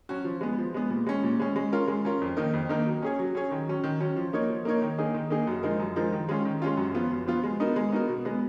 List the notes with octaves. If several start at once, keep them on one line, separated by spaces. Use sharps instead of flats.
F#3 C#4 F#4
F3
G#3 B3
F3
G#3 B3
A#2
G#3 C#4
A#2
G#3 C#4
G#3
C#4 F4 A#4
G#3
C#4 F4 A#4
F2
D#3 A#3 D#4 A#4
F2
D#3 A#3 D#4 A#4
F#3
C#4 G#4 C#5
F#3
C#4 G#4 C#5
D#3
F#3 C#4
D#3
F#3 C#4
F3
A#3 D#4 A#4 C#5
F3
A#3 D#4 A#4 C#5
D#3
A#3 D#4 G#4
D#3
A#3 D#4 G#4
F#2
F3 G#3 D#4 A#4
F#2
F3 G#3 D#4 A#4
D#3
G#3 C#4 F4
D#3
G#3 C#4 F4
F#2
F3 B3 F4
F#2
F3 B3 F4
G#3
B3 D#4 F#4 A#4
G#3
B3 D#4 F#4 A#4
B2
G#3 B3